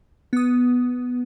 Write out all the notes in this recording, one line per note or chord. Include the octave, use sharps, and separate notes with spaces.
B3 D#6